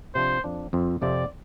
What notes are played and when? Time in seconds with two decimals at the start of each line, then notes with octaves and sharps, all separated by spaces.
0.15 C3 F3 D4 C5
0.44 F2 F3 D4
0.73 F2 F3 C4
1.02 F2 C3 F3 C4 D5